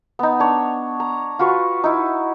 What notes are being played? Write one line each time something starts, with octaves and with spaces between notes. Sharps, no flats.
B3 D#4
D4 C#5
A#5
F4 F#4 B4 C#6
D#4 E4